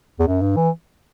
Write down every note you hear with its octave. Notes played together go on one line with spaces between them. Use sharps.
E2
F#2
G2
E3